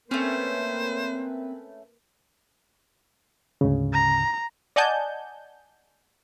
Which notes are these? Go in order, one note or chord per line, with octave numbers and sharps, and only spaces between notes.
A3 A#3 C4 C#4 B4 C5
D2 G#2 C#3
A#5
D5 D#5 F#5 G#5 A5 G6